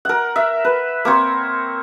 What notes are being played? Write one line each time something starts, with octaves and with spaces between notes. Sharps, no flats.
A#4 F#5
E5
B4
A#3 C4 C#5